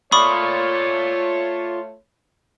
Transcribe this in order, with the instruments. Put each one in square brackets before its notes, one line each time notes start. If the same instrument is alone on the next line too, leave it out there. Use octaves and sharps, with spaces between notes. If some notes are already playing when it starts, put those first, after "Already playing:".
[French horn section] A3 C#5 [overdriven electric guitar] F4 D5 [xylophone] B5 C#6 D#6